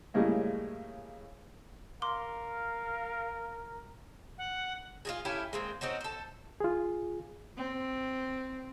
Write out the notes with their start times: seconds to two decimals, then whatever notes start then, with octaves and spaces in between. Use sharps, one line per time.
0.14 A2 C#3 G3 G#3 A#3
2.02 A#4 F5 C6 D6 G7
4.38 F#5
5.05 F4 F#4 G#4
5.25 C#4 E4 G4 A4
5.53 G#3 A#3 C4
5.81 C4 C#4 D#4 F#4
6.01 A4 C5
6.60 F4 G#4
7.57 C4